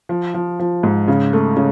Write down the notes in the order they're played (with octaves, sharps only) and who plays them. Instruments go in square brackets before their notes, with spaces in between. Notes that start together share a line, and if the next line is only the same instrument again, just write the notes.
[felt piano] F3
F3
F3
G#2
C#3
A3
C#3